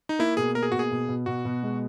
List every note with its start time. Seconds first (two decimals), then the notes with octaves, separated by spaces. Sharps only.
0.09 D#4
0.19 A#3 E4
0.37 B2 G#4
0.55 A#3 A#4
0.63 G#4
0.72 B2 F#4
0.79 G#4
0.91 B2
1.08 B2
1.26 B2 F#4
1.45 B2
1.63 G#3